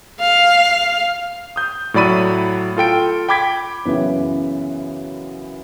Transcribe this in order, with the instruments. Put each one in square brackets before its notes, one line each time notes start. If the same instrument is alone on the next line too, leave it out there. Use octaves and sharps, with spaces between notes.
[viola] F5
[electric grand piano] D#6 G6
A2 F#3 D5 B5 D#7
F4 A4 G5 D7
G5 B5 D6 G#6 B6 D7
[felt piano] F#2 C#3 E3 B3